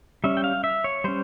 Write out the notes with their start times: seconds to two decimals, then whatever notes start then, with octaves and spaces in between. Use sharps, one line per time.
0.24 G3 C#4 E5
0.37 G5
0.44 F5
0.64 E5
0.84 C#5
1.04 G3 C#4 C5